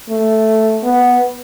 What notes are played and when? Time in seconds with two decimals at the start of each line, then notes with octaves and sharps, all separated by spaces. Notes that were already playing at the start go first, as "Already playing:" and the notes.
0.10 A3
0.84 B3